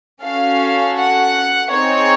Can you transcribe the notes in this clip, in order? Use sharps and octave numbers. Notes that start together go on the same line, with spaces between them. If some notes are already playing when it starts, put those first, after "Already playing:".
C#4 F#4 A4 F5
F#5
C4 D#4 G#4 C#5